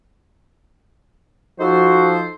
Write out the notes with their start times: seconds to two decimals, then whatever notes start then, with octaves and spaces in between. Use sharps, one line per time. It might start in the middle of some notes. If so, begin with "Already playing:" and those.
1.60 F3 D#4 F#4 A4 C5